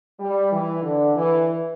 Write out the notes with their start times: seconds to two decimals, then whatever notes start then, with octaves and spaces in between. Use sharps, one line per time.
0.20 G3
0.52 E3
0.83 D3
1.15 E3